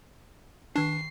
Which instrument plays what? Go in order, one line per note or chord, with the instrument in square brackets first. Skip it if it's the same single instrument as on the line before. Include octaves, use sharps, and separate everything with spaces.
[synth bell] D#3 C#6 [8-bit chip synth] D4 [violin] C7